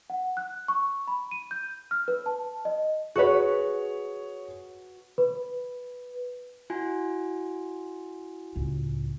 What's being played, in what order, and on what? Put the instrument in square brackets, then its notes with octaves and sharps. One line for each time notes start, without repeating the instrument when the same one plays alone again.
[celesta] F#5
F#6
C#6
B5
D#7
G6
F6
B4
A5
D#5
[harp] F#4 B4 [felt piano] G#4 C#5
[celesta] B4
[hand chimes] E4 F#4 G#5
[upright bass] C#2 A2